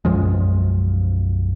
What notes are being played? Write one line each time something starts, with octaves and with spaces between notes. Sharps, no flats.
B1 F#2 F3 G#3